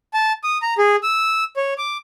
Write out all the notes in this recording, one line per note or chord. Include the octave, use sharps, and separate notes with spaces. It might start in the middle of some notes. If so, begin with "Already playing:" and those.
A5
D#6
A#5
G#4
E6
C#5
D6